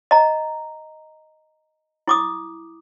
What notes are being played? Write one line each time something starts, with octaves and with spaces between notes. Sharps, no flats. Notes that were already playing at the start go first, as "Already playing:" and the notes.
D#5 A#5
E4 D6 D#6